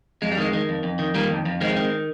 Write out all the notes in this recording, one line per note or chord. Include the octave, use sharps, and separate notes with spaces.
F2 G#3
G3
D#3 G#3
D#3
F2
F2
D#3
D#3 G3 A#3
F2
F2
D#3 G#3 C4
D#3